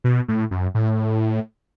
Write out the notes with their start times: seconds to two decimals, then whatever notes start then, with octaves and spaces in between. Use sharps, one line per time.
0.04 B2
0.28 A2
0.51 F#2
0.75 A2